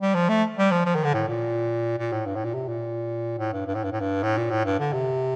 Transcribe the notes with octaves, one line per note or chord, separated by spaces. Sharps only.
G3
F3
A3
G3
F3
F3
D#3
D3
A2
A#2
A#2
A2
G2
A2
A#2
C3
A#2
A2
G2
G2
A2
G2
A2
G2
A2
A#2
A2
G2
D3
C3